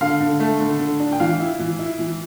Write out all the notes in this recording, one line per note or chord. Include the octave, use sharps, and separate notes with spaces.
D3 F5
D3
A3
D3
D3
D4
G5
E3 F5
E4
E3
E4
E3